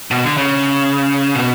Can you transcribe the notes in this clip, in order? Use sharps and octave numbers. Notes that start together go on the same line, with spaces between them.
B2
D3
C#3
B2